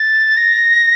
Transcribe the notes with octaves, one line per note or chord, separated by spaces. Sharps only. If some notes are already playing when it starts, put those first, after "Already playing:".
Already playing: A6
A#6